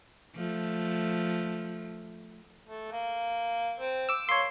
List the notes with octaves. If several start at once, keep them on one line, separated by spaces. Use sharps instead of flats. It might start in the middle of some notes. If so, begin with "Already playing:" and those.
F3 A3
A3
A#3
C4
D6 E6
A#3 C#5 C6